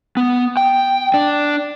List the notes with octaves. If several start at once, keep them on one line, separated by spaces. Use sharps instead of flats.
B3
G5
D4